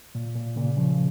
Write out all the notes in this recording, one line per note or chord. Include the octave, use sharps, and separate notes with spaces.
A#2
A#2
A#2 C#3
C#3 F3